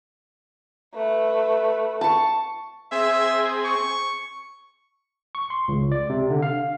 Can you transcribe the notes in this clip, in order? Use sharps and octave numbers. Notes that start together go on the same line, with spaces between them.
A3 B4
A5 C#6
C4 G#4 E5
C#6
C#6
C6
C#2
D5
C3
D3
F5